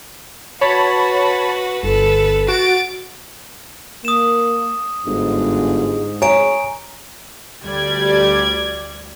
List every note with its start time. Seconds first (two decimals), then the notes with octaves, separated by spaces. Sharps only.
0.61 F#4 B4 C#5 A5 B5
1.83 G1 A4 B4
2.48 F#4 A6 D7
4.05 A#3 D#6 E7
5.06 G1 G#2
6.22 C#5 G#5 A#5 D7
7.65 D2 G3 D5 G#6